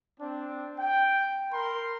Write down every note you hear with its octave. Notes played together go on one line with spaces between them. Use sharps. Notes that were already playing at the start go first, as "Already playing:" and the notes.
C4 D4
G5
A#4 B5 C6